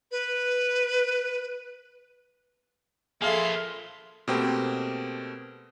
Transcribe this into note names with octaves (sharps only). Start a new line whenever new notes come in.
B4
F3 A#3 G#4 A4 E5 F5 C6
B2 A3 A#3 C4 G4